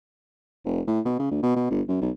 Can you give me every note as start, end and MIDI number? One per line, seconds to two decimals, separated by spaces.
0.65 0.81 29
0.87 1.00 45
1.06 1.17 47
1.19 1.30 49
1.31 1.42 38
1.43 1.54 47
1.56 1.66 47
1.70 1.81 31
1.88 1.99 42
2.02 2.10 35